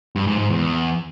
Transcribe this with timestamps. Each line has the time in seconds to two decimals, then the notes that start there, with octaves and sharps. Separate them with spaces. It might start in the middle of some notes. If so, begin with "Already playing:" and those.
0.16 G2
0.27 G#2
0.39 G#2
0.50 E2